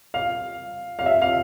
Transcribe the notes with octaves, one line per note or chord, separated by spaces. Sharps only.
F5
F5
E5
F5